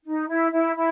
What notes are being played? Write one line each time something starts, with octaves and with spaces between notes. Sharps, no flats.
D#4
E4
E4
E4